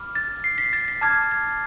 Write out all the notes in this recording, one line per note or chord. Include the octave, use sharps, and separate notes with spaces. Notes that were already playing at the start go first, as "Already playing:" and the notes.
Already playing: B5 D6 F6
A6
C7
B6
A6
B6
A5 D6 F6 G#6
A6